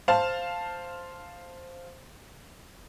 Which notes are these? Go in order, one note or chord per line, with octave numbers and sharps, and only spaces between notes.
C5 F5 A5